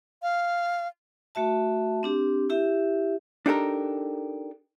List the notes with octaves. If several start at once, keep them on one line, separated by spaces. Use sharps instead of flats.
F5
A3 F#4 E5 A5
C4 D4 G4
E4 G4 E5
D4 D#4 G4 A4 A#4